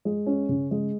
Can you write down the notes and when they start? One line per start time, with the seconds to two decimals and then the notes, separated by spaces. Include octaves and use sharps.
0.05 G#3
0.26 C#4
0.49 C#3
0.71 G#3